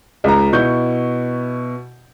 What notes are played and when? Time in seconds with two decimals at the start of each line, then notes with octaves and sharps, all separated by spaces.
0.24 C#2 A#5
0.53 B2 E4 C#6 G6